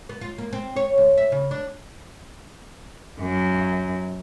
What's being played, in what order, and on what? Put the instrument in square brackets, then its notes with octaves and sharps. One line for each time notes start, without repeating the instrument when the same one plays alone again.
[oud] B3
F4
A#3
C4
C#5
D2
E5
C#3
D4
[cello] F#2